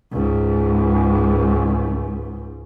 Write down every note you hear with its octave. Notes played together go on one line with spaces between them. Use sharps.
C#2 G#2